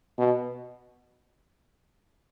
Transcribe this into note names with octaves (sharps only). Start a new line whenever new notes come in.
B2